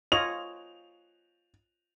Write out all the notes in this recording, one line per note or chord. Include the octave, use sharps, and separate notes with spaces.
F4 C#5 D#5 F7